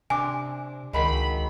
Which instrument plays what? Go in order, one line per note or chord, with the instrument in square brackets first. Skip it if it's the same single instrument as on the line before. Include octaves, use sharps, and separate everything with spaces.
[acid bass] C3 [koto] D4 [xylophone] G#5 D6
[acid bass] C#2 [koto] D#3 F#3 G#3 [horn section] B5